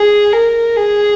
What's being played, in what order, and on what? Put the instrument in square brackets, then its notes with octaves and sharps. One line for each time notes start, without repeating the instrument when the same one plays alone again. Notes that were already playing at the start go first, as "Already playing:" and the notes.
Already playing: [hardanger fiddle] G#4
A#4
G#4